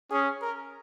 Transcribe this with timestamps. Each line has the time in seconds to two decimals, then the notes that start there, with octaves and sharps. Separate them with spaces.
0.11 C#4 G#4
0.42 A#4